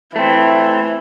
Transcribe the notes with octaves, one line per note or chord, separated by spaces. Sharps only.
E3 A3 C4